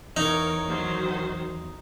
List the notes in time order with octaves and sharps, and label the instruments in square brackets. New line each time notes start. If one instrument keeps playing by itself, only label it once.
[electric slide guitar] E2 [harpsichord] D#4 [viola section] A#4 C#5
[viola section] D#3 F#3 C5